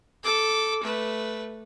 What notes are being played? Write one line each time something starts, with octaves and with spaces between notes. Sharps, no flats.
A4 D6
A3 B4